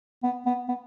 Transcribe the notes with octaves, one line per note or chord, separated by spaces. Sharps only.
B3
B3
B3